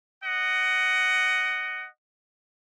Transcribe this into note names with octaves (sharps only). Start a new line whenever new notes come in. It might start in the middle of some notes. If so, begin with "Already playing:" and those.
D#5 F#5